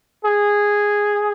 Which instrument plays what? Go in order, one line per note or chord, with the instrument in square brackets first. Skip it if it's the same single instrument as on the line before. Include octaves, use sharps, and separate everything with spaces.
[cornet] G#4